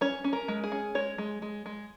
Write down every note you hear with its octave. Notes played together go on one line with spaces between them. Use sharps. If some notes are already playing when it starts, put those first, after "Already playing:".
C#4 C#5
C#4
A#4
G#3
G#4
C#4
G#3 C#5
G#3
G#3
G#3